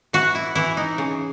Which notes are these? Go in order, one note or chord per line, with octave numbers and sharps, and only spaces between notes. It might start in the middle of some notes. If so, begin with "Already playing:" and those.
E3 F#4
E4
E3 E4
D#4
C#3